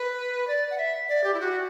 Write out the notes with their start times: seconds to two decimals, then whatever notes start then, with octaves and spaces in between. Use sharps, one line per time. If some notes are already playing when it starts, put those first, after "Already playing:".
Already playing: B4
0.48 D5
0.71 F#5
0.78 E5
1.09 D5
1.24 G4
1.34 E4
1.40 F#4